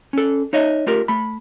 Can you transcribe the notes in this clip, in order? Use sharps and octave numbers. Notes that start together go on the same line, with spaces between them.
C#4 A4
D#4 C#5 D#5 E5
A3 F4 G4 A#4
A3 B5